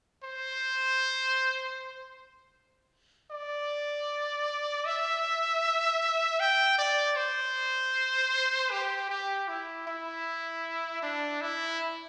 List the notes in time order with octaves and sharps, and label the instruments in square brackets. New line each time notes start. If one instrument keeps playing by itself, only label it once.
[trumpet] C5
D5
E5
G5
D5
C5
G4
G4
E4
E4
D4
E4